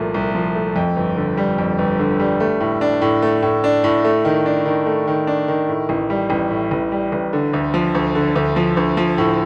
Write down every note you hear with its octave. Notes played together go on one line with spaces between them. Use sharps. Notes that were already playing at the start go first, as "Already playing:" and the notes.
Already playing: C2 A#2 F3 A3
C2
F3
A3
F2
G1
D3
G3
F2
G1
D3
G3
A3
A2
D4
A2
A3
A2
D4
A2
A3
D#3
D4
D#3
A3
D#3
D4
D#3
A2
A1
G3
A1
A2
A1
G3
A1
D3
D2
F3
D2
D3
D2
F3
D2
F3
A2